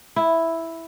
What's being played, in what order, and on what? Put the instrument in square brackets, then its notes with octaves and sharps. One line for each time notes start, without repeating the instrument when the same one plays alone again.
[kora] E4